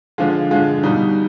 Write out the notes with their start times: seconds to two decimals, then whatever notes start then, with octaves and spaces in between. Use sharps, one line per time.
0.18 D3 F3 G#3 F4
0.51 D3 F3 G#3 F4
0.83 B2 G3 D#4